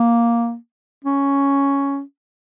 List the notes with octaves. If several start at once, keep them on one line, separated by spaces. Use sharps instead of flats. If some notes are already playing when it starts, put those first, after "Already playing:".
Already playing: A#3
C#4